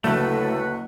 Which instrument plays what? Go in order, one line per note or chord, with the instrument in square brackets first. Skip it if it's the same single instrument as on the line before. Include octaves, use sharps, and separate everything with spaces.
[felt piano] F#1 D2 [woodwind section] A2 B4 [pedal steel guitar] A3 [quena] F#4